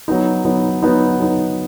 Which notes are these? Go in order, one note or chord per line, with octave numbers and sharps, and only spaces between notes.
F#3 B3 D#4
F#3 B3 D#4
F#3 B3 D#4
F#3 B3 D#4